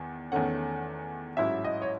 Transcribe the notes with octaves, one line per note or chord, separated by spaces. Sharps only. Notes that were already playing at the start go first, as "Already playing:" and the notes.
Already playing: E2 D#3
E2 D#3 A3 C#4 F#5
A1 G#2 F#3 C#4 E4 E5
D#5
C#5